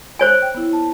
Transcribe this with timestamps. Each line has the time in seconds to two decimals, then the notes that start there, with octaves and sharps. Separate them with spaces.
0.19 C5 C#5 G#5
0.42 G5
0.55 B3 E4
0.73 A5